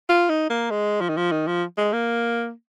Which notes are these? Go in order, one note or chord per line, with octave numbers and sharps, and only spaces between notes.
F4
D#4
A#3
G#3
F3
D#3
F3
D#3
F3
G#3
A#3